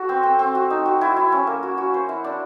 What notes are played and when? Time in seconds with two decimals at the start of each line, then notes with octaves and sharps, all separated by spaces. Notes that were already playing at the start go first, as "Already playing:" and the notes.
Already playing: F#4 A4
0.09 C4
0.23 C4
0.39 C4
0.55 F#4
0.70 D#4
0.86 F#4
1.01 E4
1.17 E4
1.32 C#4
1.47 A#3
1.63 F#4
1.78 F#4
1.94 C5
2.09 E4
2.24 D4